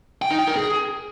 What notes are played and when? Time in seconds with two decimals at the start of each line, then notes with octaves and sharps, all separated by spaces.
0.22 G5
0.30 D#4
0.39 G5
0.48 A#4
0.56 G#4